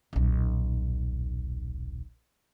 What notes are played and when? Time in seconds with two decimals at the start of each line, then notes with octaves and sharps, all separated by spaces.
0.13 D#1 B1